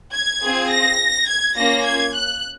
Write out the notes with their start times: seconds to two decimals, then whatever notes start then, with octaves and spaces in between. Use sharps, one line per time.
0.14 G#6
0.42 C4 F4 G#4
0.71 A#6
1.27 G#6
1.56 A#3 C#4 F4 A#6
1.85 G#6
2.14 F#6